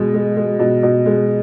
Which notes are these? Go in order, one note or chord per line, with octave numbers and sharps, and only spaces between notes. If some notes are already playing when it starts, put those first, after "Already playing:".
Already playing: B2 G#3
G#3
G#3
B2
B2
G#3